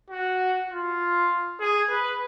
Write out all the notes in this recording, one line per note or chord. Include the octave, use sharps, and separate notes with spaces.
F#4
F4
G#4
B4